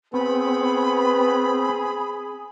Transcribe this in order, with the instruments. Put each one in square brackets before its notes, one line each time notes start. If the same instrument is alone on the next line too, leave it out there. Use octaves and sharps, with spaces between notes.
[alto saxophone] B3 [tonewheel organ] C4 [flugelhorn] G#4 [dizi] B5